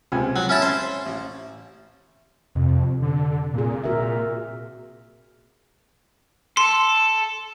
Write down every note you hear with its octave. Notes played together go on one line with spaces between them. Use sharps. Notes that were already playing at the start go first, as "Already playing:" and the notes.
C#2 C3 G#5
F#3
C#4 E4 A5
C5
A1
F2 C3
D3
A#2 C4 G#4
F#4 A#4 E5
A4 C6